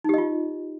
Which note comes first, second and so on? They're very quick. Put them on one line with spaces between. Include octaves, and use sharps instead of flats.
D#4 G4 D#5 F4